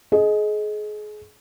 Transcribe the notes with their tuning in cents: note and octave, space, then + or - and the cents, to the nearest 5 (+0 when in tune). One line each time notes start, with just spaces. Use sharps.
G#4 +30 D#5 +5